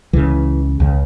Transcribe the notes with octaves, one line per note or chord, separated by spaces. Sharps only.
C#2 C#3 E3
C#2 C#3